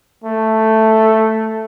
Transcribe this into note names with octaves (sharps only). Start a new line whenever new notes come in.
A3